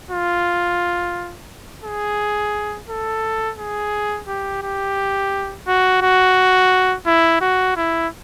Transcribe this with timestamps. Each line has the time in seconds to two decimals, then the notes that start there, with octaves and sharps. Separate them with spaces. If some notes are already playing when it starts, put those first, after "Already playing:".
0.11 F4
1.84 G#4
2.89 A4
3.58 G#4
4.28 G4
4.62 G4
5.67 F#4
6.02 F#4
7.06 E4
7.41 F#4
7.76 E4